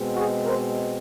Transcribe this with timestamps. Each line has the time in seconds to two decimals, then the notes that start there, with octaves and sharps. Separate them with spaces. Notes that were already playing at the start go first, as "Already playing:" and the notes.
Already playing: B2 G#3 C4
0.16 F#4 G#4
0.45 A#4 C5